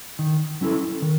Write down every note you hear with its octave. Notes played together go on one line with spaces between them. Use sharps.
D#3
F#3 C#4 E4 A4
D#3